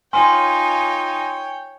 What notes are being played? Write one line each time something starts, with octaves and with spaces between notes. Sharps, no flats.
D#4 F4 C#5 G5 G#5 C6